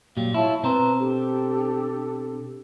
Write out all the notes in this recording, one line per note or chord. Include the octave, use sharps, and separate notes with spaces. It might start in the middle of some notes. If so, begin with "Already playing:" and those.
A#2 F#3 G3 F5
E4 F4 C#5 A5 C#6
B2 C4 B4 C5 A#5
D4 G4 A4